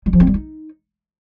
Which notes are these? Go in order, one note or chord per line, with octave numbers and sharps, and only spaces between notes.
G3
F3
C4
G3
D#4